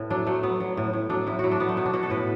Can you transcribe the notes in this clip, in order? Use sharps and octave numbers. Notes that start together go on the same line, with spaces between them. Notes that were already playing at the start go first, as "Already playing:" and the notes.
Already playing: A2 B3
F#3 D4
F#3 A3
F#3 B3
F#3
A2
A2
F#3 D4
A2 E4
F#3 E4 F#4
D4
F#3 B3
A3
B2 B3
D4
B2 F#4
A4
A2 B4